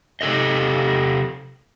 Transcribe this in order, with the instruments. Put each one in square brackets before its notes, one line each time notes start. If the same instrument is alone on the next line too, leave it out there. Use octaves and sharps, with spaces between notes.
[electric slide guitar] C3 G4 A4 C5 D#5